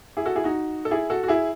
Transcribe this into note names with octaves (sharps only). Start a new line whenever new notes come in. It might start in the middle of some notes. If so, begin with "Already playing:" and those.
E4 G#4
F#4 A4
E4 G#4
D#4 F#4
A4
E4 G#4
F#4 A4
F#4
E4 G#4